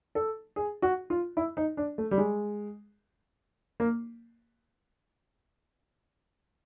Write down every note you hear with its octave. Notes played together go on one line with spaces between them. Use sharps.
A4
G#4
F#4
F4
E4
D#4
D4
A3
G3
G#3
A#3